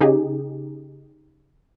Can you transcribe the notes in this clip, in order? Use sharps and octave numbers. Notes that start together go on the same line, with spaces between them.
C#3 D#4 G4 G#4